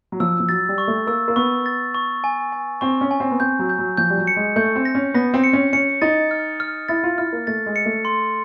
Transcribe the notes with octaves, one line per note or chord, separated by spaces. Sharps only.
F#3
F3 E6
F3
F#3 A6
G3
C#6
A3
A#3 E6
A#3
B3 C#6
A6
C#6
G#5
G#5
C4 C#6
C#4
G#5
C4
B3
C4 G6
F#3
G6
F#3
F3 G6
G3
F#3
C#7
G#3
A3 G6
C4
A#6
C#4
B3 A#6
C4
C#7
C#4
C#4 C#7
D#4 A6
F6
F6
E4 A6
F4
E4 F6
A#3
A3 A6
G#3
C#7
A3
C6